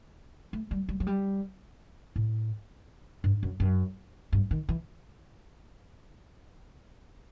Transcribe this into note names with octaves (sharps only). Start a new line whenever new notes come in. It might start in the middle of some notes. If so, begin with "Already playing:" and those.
A3
G3
G3
F#3
G3
A2
G2
F#2
F#2
G2
D#3
E3